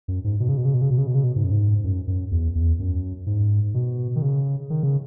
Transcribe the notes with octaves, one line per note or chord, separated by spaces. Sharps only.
F#2
G#2
B2
C#3
B2
C#3
B2
C#3
B2
C#3
B2
C#3
B2
G#2
F#2
G#2
F#2
F#2
E2
E2
F#2
G#2
B2
D#3
C#3
D#3
C#3